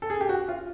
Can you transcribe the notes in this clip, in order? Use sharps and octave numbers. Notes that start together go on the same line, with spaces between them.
A4
G#4
G4
F#4
F4